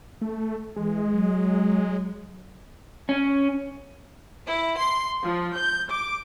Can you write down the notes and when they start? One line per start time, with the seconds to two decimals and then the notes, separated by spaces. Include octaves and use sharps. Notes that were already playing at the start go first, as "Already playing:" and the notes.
0.21 A3
0.76 E3 G#3
1.11 F#3
3.09 C#4
4.46 E4
4.77 C6
5.23 F3
5.56 G6
5.89 D6